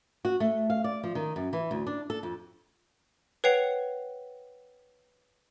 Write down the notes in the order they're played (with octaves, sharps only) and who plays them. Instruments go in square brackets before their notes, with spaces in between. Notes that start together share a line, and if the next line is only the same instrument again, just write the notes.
[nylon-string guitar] F#4
A3
F5
D5
F3
D#3
F#2
E3
D2
D4
A4
F2
[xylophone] B4 C#5 F#5 G5 C7 F7